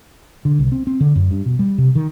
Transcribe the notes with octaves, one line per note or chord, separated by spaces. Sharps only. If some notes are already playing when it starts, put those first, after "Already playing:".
D3
C2
C4
C4
D3
F#2
G2
B2
G3
C3
D#3